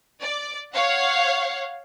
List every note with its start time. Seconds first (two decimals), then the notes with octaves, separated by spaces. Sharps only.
0.21 D5
0.74 C#5 F5 F#5